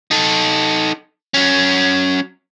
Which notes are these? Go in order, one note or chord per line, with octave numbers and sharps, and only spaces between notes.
D#4 A4
F#3 C#4